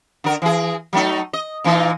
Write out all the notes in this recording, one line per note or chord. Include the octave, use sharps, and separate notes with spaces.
D3 A#4
E3 G#4
F#3 A3 D#4
D#5
A#2 E3 D#4